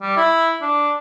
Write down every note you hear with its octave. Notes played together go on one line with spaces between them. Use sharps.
G3
E4
D4